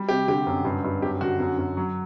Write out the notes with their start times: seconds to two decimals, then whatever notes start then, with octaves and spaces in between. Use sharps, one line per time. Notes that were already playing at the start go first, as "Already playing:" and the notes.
Already playing: G3
0.09 C3 G4
0.28 D3 G4
0.47 F#2
0.65 G2
0.84 G2
1.02 F#2 G4
1.21 D3 F#4
1.40 F#2
1.58 F#2
1.77 F#3